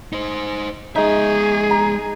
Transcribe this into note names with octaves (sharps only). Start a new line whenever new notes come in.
D#4 C5
G#3 D#4 G#4 E5
A#5